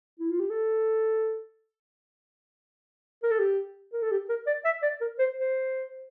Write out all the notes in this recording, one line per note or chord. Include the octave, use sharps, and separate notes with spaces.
E4
F4
G4
A4
A#4
A4
G4
A#4
A4
G4
A#4
D5
E5
D5
A#4
C5
C5